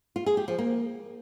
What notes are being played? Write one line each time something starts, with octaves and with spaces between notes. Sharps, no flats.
F4
G#4
G4
F3
A#3